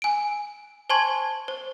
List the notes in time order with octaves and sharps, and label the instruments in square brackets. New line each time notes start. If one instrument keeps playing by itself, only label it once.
[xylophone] G#5 D7
C5 G#5 A5 C6 C#6 G#6
C5